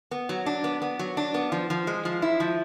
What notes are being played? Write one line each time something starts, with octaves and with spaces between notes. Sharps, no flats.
B3
F#3
D4
B3
B3
F#3
D4
B3
F3
F3
G#3
F3
E4
F3